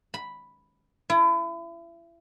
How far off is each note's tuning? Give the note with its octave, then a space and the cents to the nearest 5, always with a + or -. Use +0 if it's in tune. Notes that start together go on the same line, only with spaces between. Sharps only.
B5 +0
E4 +35